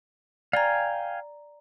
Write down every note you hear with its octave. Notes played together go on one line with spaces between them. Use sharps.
D5 F5 G5 G#5 A#5